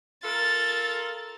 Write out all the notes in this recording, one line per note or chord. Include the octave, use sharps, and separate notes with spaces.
F4 A4 A#4 A6